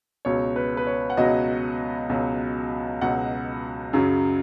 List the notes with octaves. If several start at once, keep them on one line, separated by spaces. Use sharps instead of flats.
C#2 B2 F#3 C#5
B4
B4
C#5
F#5
C#2 B2 F#3 D#5
C#2 B2 F#3
C#2 B2 F#3 F#5
F#2 C#3 F#3